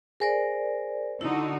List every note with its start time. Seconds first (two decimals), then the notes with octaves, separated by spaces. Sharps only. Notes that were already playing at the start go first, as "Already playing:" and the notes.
0.20 G#4 A#4 C5 D5 G#5 A#6
1.21 D3 D#4 E4 F#4